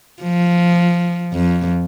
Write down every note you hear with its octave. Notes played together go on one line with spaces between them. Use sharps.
F3
F2